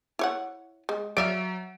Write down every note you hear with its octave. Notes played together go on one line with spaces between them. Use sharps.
E4 C#5 F#5
G#3
F#3 D5 E5 F5 D7